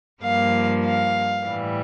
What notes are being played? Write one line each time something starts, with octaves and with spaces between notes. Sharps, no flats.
G2 F3 A#3 F5
F5
A2 E3 G3